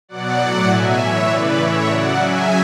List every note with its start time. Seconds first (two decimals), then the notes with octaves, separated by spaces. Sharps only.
0.09 B2 F#3 D5 F#5
0.38 A2 F#3 D5 F#5
0.68 B2 F#3 E5 G#5
0.97 A2 E3 C#5 E5
1.27 C#3 E3 B4 D5
1.57 A2 E3 C#5 E5
1.87 C#3 F#3 D5 F#5
2.16 C#3 F#3 E5 G#5